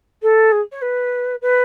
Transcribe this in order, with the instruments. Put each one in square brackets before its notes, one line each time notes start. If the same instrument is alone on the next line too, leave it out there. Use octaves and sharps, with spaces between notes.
[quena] A4
G#4
C#5
B4
B4